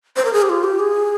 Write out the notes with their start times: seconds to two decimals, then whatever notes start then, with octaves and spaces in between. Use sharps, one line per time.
0.16 C5
0.25 A#4
0.33 G#4
0.42 G4
0.49 F4
0.64 G4
0.79 G#4